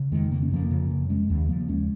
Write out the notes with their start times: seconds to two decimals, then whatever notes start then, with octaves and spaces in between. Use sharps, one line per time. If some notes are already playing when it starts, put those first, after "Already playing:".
Already playing: C#3
0.12 F2 D#3 G#3
0.31 C#3 A#3
0.43 C#4
0.51 F2 F3 A#3
0.71 C#3
0.90 F2
1.10 C#3 G#3 C#4
1.30 D#2
1.49 C#3 F3 A#3
1.60 A#3
1.68 D#2 G#3 C#4